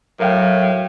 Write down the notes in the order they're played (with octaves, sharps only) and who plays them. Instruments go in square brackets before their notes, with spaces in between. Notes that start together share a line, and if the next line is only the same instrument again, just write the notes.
[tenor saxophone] A2 [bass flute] F#3 [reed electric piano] A#4 F5 G5